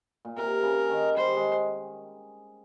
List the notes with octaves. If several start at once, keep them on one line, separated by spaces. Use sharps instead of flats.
A#2
C3 A#4
C#3
D#3
G3 C5
G#3